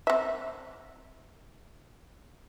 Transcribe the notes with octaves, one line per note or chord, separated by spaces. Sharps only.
C4 E5